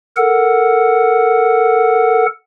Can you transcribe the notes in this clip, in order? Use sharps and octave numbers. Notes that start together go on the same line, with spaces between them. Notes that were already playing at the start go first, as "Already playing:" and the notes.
A4 A#4 F#5